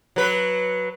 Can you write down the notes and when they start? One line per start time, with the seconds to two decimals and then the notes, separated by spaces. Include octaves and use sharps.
0.16 F#3 B4